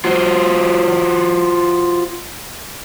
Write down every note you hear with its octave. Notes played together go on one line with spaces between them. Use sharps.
F4 F#4 C5